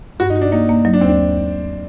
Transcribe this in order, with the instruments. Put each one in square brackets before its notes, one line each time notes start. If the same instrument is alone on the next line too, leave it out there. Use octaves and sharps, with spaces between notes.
[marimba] G2 [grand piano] F#4
[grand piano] D#4
[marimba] F#4
[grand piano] D4
[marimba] A#3 [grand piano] D#4
[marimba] A#3
[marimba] F#3 [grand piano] D#4
[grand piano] D4
[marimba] D#2 [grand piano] C4
[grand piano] D4